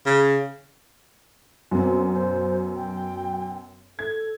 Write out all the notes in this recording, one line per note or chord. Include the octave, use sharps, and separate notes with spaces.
C#3
F#2 B2 C4
C5
G5
A4 G#6